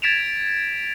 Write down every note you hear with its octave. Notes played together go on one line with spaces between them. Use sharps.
G#6 A6 B6 D7 E7 F7